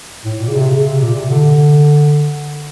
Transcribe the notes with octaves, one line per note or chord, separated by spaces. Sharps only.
A2
A#2
C#3
C3
C#3
C3
A#2
C3
D3